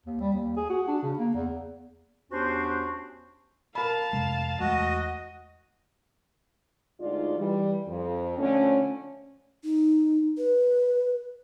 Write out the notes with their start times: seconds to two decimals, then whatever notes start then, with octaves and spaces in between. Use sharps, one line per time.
0.06 D#2
0.20 G3
0.34 D#2
0.57 G#4
0.70 F#4
0.88 D4
1.03 C#3
1.19 A#3
1.34 E2
2.31 E2 C#4 D4 F#4 G4 C5
3.75 A#4 F5 A5 B5
4.13 F2 C3 G#3
4.60 E2 G#3 A3 F#4 D#5
7.01 D2 G#3 D#4 F4 F#4 D5
7.38 E3 G3
7.88 F2
8.38 D3 F3 A3 C#4
9.64 D#4
10.38 B4